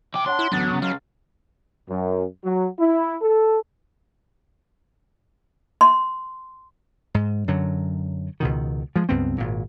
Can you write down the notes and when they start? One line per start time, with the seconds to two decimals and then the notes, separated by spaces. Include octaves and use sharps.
0.14 C3 G5 D6
0.26 D4 C#5 F#5 A5 C6
0.39 E4
0.52 A1 D2 F#3 B3 D4 A6
0.70 C#3
0.82 C#2 F#3 F5
1.89 F#2
2.44 F#3
2.79 E4
3.22 A4
5.81 C6
7.14 G#2
7.48 F#2 D3 F#3
8.40 C#2 B2 D#3
8.96 F3 G#3
9.09 C#2 G2 B3 C4
9.38 G#1 A#2